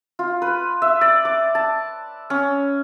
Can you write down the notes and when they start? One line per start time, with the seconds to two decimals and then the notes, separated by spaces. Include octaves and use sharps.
0.19 F4
0.42 B4
0.82 E5
1.01 D5
1.25 D6
1.55 A5
2.30 C#4